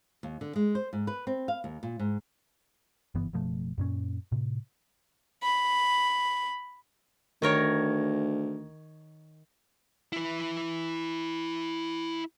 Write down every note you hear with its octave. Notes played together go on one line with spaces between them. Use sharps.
D#2
D3
G#3
C5
G#2
B4
C4
F5
D#2
A#2
G#2
F#1 G2 E3 B3
F#1 B2 F3 A3
F#2 A#2 C#4
A2 C3
B5
D2 D#3 A#4 C#5
E4 B4